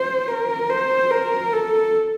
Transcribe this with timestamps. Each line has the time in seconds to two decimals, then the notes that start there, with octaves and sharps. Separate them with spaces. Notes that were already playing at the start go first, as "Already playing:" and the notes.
Already playing: C5
0.29 A#4
0.70 C5
1.11 A#4
1.53 A4